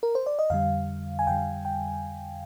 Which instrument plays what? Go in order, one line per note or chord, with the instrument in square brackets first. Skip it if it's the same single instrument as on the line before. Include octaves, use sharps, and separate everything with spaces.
[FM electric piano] A#4
C5
D5
D#5
F2 D3 G3 F5
G#5
F2 D3 G3 G5
G5